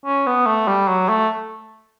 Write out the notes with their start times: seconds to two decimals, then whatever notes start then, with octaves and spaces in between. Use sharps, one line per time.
0.06 C#4
0.27 B3
0.47 A3
0.68 G3
0.88 F#3
1.09 A3